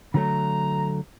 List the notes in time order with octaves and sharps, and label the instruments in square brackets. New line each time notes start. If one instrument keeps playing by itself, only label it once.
[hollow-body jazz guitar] D3 F#3 A3 [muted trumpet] A#5